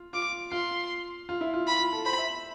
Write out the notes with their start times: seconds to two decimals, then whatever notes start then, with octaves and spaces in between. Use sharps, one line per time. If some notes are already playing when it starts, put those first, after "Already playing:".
Already playing: F4
0.13 F4 D6
0.52 F4 C6
1.29 F4
1.41 E4
1.54 F4
1.67 B5
1.79 F4
1.93 A4
2.05 C5 B5
2.18 E5